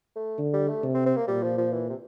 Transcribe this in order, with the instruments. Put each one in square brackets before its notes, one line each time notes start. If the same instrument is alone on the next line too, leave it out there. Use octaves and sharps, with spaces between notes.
[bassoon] A3
[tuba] D3
[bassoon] G3
A3
[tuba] C3
[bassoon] C4
C4
A#3
[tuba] A#2 [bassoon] G3
[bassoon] F3
F3
E3
C3